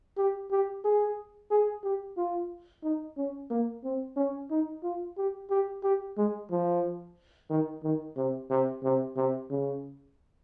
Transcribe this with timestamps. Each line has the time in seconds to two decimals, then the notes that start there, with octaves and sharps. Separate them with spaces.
0.17 G4
0.51 G4
0.85 G#4
1.51 G#4
1.84 G4
2.17 F4
2.83 D#4
3.17 C#4
3.50 A#3
3.84 C4
4.17 C#4
4.51 D#4
4.83 F4
5.17 G4
5.50 G4
5.83 G4
6.17 G#3
6.50 F3
7.50 D#3
7.83 D#3
8.16 C3
8.50 C3
8.83 C3
9.16 C3
9.50 C#3